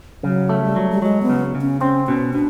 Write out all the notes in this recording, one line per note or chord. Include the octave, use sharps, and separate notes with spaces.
C#3 F#3
A3
G3
F#3
G3
F#3 G#3
B3
C#3
C#3
C#4
C4 C#4
B2 C#4
B2 D4